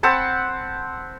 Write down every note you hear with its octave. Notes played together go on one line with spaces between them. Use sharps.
C4 F#5 A5 B5